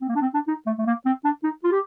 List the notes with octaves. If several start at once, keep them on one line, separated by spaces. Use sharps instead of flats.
C4
A#3
D4
C4
D4
D#4
A3
A3
A#3
C4
D4
D#4
F4
G4